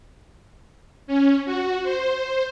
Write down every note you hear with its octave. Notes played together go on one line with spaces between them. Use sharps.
C#4
F#4
C5